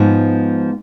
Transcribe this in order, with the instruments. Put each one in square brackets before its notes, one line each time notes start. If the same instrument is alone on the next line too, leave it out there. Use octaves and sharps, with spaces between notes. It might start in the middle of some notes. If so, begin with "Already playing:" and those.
Already playing: [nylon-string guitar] G#2 F3 B3